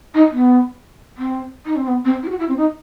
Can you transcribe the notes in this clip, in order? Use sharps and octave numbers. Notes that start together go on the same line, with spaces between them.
D#4
B3
C4
D#4
C4
B3
C4
E4
G4
F#4
E4
C4
D#4